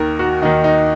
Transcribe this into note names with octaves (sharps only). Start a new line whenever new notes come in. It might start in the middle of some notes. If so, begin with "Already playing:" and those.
Already playing: D#2 D#3 A#4
F#4
D#2 D#3 D#4
D#4